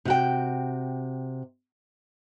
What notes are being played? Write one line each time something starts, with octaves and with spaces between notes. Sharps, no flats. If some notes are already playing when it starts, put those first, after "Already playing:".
C3 F#4 G5